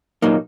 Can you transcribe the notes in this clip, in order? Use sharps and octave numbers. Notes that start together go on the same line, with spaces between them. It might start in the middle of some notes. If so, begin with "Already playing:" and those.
A#2 F#3 A#3 D#4